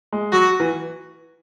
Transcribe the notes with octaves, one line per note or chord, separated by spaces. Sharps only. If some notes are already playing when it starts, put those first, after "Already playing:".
G#3
F#3 F#4
E3